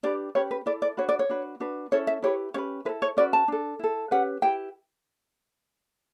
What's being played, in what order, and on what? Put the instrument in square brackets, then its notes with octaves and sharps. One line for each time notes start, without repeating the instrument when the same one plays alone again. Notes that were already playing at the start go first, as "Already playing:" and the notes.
[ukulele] D4 G4 B4 D5
C#4 G4 B4 C#5
B4
E4 A4 D5
D5
D4 F#4 B4 C#5
D5
C#5
D4 F#4 B4
D4 F#4 B4
C#4 E4 A4 C#5
E5
E4 G4 B4 C#5
C#4 G4 B4 C#5
E4 B4
A4
C#5
C#4 F#4 B4 D5
A5
D4 A4
E4 A4
C#4 G4 B4 F#5
E4 G4 B4 G5